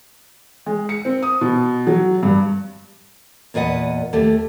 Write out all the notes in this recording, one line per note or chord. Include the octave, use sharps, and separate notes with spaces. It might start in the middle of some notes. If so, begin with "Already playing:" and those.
G#3
C#7
C4
D#6
B2
F#3
G2
E2 A#2 B4 D#5 F#5
D#2 A3 G4